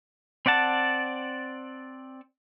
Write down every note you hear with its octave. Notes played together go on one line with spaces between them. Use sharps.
C4 D5 F#5 A5